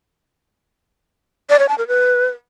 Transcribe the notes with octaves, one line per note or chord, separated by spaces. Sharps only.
D5
C#5
A5
A#4
B4